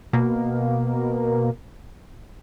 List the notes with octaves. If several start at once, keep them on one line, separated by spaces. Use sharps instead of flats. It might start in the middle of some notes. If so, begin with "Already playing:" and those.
B2 A#3